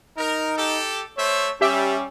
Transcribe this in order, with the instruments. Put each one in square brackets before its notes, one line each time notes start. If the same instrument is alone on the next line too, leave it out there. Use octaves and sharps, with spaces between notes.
[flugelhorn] D#4 [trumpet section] A#4
[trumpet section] G4 A4
[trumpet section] A3 C5 E5 [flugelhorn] C#5
[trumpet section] G3 [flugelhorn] C#4 [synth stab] G4 E5